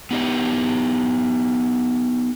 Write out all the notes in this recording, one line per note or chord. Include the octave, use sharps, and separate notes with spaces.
B3 D#4 G4 D#5 E5